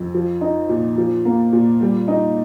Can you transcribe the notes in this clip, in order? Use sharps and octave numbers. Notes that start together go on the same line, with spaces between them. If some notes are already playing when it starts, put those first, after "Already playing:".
Already playing: F2
F3
D#4
A#2
F3
A#3
A#2
G3
D#4